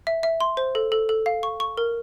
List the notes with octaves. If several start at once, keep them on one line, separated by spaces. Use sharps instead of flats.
E5
E5
C6
C5
A4
A4
A4
F5
C#6
C#6
A#4